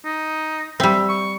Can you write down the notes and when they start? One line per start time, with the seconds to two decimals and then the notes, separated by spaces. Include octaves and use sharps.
0.04 D#4
0.80 G3 C4 E5
1.09 C#6